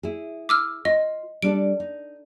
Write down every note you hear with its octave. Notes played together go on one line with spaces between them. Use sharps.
E4 G#4
D6 E6 F6
F4 D#5
G3 D4 A4 D7
D#4